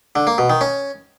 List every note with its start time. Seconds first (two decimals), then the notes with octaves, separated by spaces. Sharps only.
0.16 D3
0.27 A#3
0.38 B2
0.50 D#3
0.61 C#4